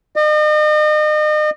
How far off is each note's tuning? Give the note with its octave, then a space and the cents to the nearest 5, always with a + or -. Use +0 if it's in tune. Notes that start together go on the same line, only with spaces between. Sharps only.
D#5 -40